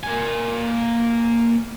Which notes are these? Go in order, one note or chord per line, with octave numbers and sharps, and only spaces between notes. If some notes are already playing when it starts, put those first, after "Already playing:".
A#3 G#5